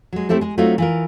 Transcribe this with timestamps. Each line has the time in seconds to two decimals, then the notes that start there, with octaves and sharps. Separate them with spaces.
0.12 F#3 G#3
0.29 A3 C4 E4 G4 A4
0.41 G#3 G#4
0.58 F#3 A3 C4 D#4 F4 F#4
0.78 E3 F4 A#4